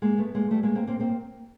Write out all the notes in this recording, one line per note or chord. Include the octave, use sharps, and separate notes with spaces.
G#3 A#3
A3 B3
G#3 A#3
G3 A3
G#3 A#3
A#3 C4
A#3 C4
A#3 C4